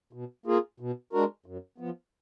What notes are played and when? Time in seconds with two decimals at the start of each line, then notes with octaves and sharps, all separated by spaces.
0.13 B2
0.46 A#3 F4 G#4
0.80 B2
1.13 G#3 D4 F#4 A#4
1.46 F#2
1.78 F3 B3